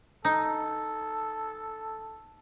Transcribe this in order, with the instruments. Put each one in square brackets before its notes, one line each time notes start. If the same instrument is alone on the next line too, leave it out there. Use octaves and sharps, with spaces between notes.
[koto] D#4 [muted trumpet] A4